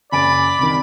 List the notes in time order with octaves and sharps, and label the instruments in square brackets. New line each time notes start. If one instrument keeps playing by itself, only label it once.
[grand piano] F#1 G#5 D7 [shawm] D5 [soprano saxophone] B5
[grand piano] C2 D#3